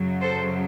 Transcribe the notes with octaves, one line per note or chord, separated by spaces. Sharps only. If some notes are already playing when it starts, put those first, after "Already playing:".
Already playing: F#2 C#3 F#3
A4 C5